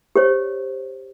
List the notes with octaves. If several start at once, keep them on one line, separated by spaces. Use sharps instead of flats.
G4 C5 C#5